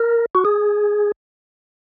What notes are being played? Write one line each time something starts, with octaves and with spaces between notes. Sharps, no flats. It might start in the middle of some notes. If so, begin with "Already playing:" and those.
Already playing: A#4
F#4
G#4